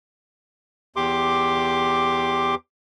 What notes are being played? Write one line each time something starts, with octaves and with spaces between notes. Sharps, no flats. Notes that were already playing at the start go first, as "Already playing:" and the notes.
E2 G4 C6 D6